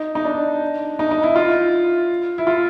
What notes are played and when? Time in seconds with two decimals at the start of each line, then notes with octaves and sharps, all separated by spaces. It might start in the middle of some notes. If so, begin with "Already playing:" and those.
Already playing: D#4
0.15 D#4
0.25 D4
0.99 D#4
1.11 D#4
1.23 E4
1.36 F4
2.38 E4
2.47 F4